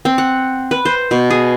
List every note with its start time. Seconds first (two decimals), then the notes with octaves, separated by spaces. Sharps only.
0.05 C4
0.18 F#5
0.71 B4
0.85 C5
1.11 B2
1.30 G#4